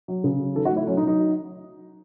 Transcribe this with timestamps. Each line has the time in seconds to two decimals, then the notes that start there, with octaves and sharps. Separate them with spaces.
0.08 F#3
0.24 C#3
0.40 F#3
0.55 D#3 A4
0.65 F#4
0.71 A3
0.76 E4
0.87 F#3 C#4
0.97 D#4
1.03 F#3
1.08 D#4